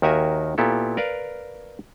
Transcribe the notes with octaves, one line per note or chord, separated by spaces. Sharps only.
D#2 D#3 F#4 A#4 E5 G#5
A#2 B3 E4 G4 A4
A#4 B4 D5 F5